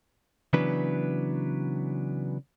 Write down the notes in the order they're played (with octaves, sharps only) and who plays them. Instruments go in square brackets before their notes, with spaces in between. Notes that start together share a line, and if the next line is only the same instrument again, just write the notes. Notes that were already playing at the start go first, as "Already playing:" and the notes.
[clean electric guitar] C#3 E3 F#3 B3 D4 B4